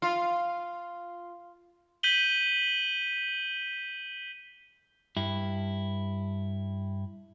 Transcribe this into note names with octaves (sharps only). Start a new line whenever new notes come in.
F4
G6 B6 D#7 F#7 G7
G2 E4